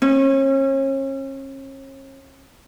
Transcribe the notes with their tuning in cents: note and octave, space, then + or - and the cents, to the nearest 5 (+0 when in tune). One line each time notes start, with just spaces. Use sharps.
C#4 -40